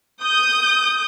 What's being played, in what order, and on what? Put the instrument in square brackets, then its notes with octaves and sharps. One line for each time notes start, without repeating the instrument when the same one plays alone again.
[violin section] D#6 G6